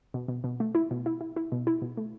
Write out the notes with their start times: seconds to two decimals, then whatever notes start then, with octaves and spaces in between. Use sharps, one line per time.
0.14 B2
0.28 B2
0.44 B2
0.60 A3
0.75 E4
0.91 B2
1.06 E4
1.21 E4
1.36 E4
1.52 B2
1.67 E4
1.82 B2
1.97 A3